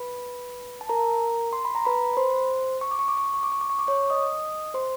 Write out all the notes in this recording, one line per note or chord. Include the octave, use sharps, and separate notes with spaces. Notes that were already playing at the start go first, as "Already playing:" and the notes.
Already playing: B4 B5
A5
A#4 A#5
C6
B5
A#5
B4 B5
B5
C5 C6
C#6
D6
C#6
D6
C#6
D6
C#6
D6
C#6
D6
C#6
D6
C#5 C#6
D#5 D#6
C5 C6